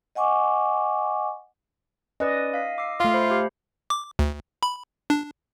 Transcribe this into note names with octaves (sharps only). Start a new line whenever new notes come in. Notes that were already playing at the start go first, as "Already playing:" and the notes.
D#5 F#5 G#5 C#6 D6
C#4 B4 D5 D#5
F5 B6
D6 E6 C7
A3 F4 F5
C5 B5
G4
D6
D2
B5
D4